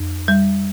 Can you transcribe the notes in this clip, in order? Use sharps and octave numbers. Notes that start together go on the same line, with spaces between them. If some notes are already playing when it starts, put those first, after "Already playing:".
Already playing: F2
G3